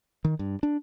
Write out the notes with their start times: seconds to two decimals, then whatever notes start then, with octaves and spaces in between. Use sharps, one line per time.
0.25 D#3
0.39 G2
0.63 D4